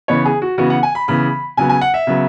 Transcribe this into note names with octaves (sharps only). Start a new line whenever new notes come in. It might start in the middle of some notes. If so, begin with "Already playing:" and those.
C#3 E3 B3 C#5
G#4
F#4
C#3 E3 B3 F#4
F#5
G#5
B5
C#3 E3 B3 B5
C#3 F#3 B3 G#5
G#5
F#5
E5
C#3 F#3 B3